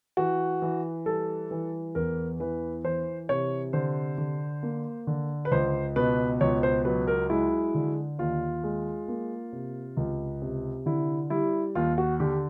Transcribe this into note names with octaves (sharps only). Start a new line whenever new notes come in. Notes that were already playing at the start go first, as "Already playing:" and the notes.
E3 F#4
E3
G3 A4
E3
E2 A#4
E3 B4
E3 C5
C3 C#5
D3 C5
D3
A#3
D3
B4
C#2 C5
B2 B4
C#2 C#5
C5
F#3 B4
A#4
G#3 E4
D3
D#2 F4
G#3
A#3
C3
C#2
C3
D3 E4
G3 E4
D#2 F4
F#4
D3 G4